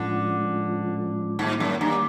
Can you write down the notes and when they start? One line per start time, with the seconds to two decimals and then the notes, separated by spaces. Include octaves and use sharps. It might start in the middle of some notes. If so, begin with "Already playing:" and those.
Already playing: A2 D3 F3 G#3 C#4 F4
1.38 G#2 D#3 G3 A#3 D#4
1.60 F#2
1.81 G2